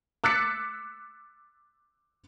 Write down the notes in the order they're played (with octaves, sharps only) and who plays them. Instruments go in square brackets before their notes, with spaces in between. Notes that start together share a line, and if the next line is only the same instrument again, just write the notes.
[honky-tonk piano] D6 E6 F#6 A6 B6 C#7